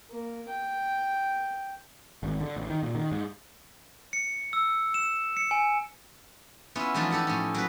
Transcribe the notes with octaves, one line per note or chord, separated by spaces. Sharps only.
A#3
G5
G#1
D3
A1
D#3
A#2
D#3
G#2
C#7
E6
E7
C#7
G#5
B3 C#4 E4 F4
E3 F3 A3 D4 D#4 F4
D#4 G4 A4 A#4 F#5
A2 F3 C#4
F#3 D#4 B4